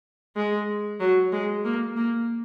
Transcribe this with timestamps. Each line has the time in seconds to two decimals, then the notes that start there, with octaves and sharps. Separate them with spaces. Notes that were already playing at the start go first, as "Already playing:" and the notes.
0.36 G#3
1.01 F#3
1.32 G#3
1.65 A#3
1.96 A#3